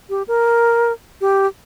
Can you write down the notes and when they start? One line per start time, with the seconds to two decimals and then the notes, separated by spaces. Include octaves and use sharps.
0.10 G4
0.28 A#4
1.21 G4